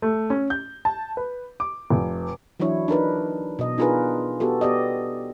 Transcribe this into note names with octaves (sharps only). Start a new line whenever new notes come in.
A3
C#4
G6
A5
B4
D6
F1
E3 F#3 D4 E4 C#5
D4 D#4 A#4 B4
B2 D#5
D4 D#4 F4 G#4 A#4 B4
B3 F#4 G4 A4
B3 G4 D5 D#5